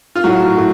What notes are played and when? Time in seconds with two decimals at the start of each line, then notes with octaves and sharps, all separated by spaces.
0.15 F4
0.24 A2 F#3 F#4
0.57 A2